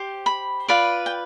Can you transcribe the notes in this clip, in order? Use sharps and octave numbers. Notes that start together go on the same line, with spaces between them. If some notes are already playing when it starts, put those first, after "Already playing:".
Already playing: G4 C5
B5
F4 B4 D5 B5
G5